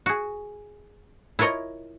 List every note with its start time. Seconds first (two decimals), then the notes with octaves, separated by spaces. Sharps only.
0.06 F#4 G#4
1.39 E4 F4 A#4 C#5 D#5